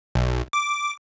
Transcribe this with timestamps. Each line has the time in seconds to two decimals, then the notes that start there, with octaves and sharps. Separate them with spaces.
0.15 B1
0.53 D6